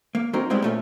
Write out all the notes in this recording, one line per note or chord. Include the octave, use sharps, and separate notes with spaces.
A#3
F#3 C4 D#4 A#4
G3 G#3 B3 C4 E4
A#2 A3 C#4